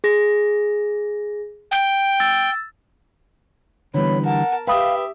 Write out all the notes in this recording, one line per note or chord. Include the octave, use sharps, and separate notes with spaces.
G#4 A#6
G5
E6 A6
D3 E3 G3 B3 C#5 B5
A#4 F#5 A5
G4 B4 E5 F5 G5 B5 D#6